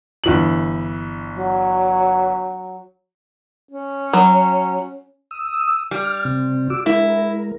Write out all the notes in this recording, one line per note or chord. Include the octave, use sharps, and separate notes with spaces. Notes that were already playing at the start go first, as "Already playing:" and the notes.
G1 E3 F#7
F#3
C#4
F#3
D#6 E6
G3 F6
C3 C4
F#4 D6 E6
G#3 E4 A#4